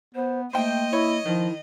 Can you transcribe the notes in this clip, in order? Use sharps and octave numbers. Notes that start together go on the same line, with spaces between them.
B3 C5
A3 A#3 C5 D#5 G5
E4 C#5
D#3 F3 E4